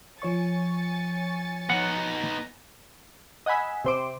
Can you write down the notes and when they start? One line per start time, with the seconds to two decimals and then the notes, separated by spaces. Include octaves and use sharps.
0.22 F3 C#5 G#5 C#6 A6 C#7
1.70 B3 D#4 F#5
3.46 D#5 F#5 G#5 B5 E6
3.84 C3 C5 D6